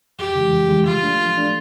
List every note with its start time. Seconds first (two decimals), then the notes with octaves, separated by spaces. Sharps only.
0.19 F2 G4
0.35 C#3 E3 G#3
0.52 F2
0.69 C#3 E3 G#3
0.86 F3 F4
1.03 A3 D4
1.20 F3
1.36 A3 D4